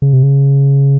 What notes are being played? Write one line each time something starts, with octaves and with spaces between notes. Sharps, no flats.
C#3
C3
C#3